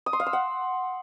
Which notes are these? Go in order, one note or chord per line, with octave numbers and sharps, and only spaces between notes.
D#6
C6
F5
E6
F#5